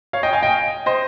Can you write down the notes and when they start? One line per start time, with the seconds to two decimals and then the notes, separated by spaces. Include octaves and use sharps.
0.13 C#5 F5
0.23 D#5 G5
0.33 F5 G#5
0.43 D#5 G5
0.86 C5 D#5